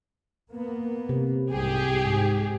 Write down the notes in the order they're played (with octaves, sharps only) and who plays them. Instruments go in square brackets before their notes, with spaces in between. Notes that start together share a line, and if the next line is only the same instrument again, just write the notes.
[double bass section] A#3 B3
[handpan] C3
[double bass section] C2 G#2 [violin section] G4 G#4
[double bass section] G#2